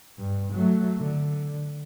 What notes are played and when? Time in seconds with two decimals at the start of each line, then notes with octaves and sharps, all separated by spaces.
0.19 G2
0.54 F#3 A3
0.99 D3